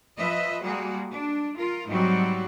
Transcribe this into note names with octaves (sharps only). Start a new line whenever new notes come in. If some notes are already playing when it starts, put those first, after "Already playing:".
F3 B4 D#5 E5
G3 G#3 A#3 F#4 G#4
D4
F4 A#4
G#2 F#3 G3 C4 F#4